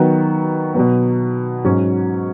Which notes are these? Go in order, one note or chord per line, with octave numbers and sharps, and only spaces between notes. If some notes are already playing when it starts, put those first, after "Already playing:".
Already playing: D#3 F#3 B3 F#4
B2 F#3 B3
G#2 F#3 C#4